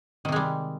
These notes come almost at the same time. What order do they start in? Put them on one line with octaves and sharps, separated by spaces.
D#3 C3 G#3 G3